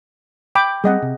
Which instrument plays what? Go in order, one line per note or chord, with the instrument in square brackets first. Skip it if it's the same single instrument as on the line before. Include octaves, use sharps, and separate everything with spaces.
[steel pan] G5 B5 D6
[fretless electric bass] G3 B3 C4 [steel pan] G#4 D#5 F#5
[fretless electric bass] C3